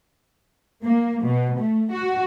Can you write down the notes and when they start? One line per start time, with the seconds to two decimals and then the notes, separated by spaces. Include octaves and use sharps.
0.85 A#3
1.26 B2
1.58 A3
1.93 F#4